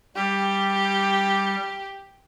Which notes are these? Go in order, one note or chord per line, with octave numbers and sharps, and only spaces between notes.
G3 G4